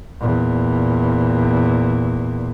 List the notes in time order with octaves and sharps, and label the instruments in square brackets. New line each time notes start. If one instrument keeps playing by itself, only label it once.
[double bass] E2 A#2